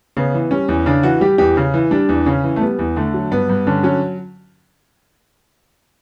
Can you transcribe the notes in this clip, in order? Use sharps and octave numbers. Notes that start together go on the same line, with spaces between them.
C#3 B3
E3
G3 C#4
E2
C#3 D4
E3 F#4
G3 G4
E2 G4
C#3
E3
G3 D4
E2
C#3 C#4
E3
A3
G3 B3
E2
D3 A3
F#3
G2 B3
G2
D3 C#4
F#3 C#4